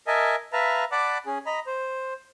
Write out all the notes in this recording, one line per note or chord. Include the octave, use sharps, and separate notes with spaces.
A#4 D#5 E5 G#5 A5
B4 E5 F5 A5 A#5
D5 F#5 A5 B5 D6
C#4 G#4
D#5 A#5 B5
C5